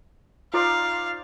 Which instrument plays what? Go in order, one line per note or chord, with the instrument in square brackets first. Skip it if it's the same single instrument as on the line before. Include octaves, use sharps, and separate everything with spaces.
[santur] D#4 C5 D5 [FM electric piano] F4 [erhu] F5